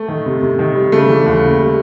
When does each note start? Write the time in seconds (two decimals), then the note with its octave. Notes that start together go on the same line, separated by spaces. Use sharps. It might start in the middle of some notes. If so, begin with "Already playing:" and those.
Already playing: A3
0.08 D#3
0.26 C3
0.43 C3
0.59 D#3
0.75 G3
0.92 C#3 A3
1.09 E3
1.26 D#2
1.41 C#3
1.59 G3